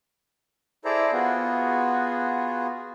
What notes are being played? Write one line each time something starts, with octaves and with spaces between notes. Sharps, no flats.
E4 G#4 A4 C5 D5 A#5
B3 F4 F#4 G#4